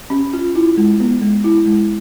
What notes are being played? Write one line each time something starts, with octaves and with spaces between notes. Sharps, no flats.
C#4
F4
E4
G#3
B3
G#3
E4
G#3